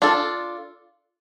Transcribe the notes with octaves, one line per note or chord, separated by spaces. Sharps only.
D4 F4 A4